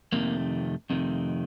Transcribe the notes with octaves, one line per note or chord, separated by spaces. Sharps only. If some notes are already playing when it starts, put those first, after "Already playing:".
F2 C3 D#3 A3 A#3
F2 C3 D#3 A3